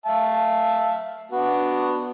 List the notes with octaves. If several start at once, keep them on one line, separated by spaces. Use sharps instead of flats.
E5 F5 A5
B3 D4 F#4